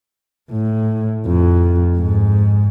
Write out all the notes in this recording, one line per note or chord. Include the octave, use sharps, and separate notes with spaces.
A2
F2
G#2